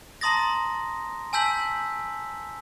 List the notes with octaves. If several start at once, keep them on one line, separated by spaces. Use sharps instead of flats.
A5 A#5 C6 D#6 A6 A#6
G#5 A5 E6 G6 B6 F#7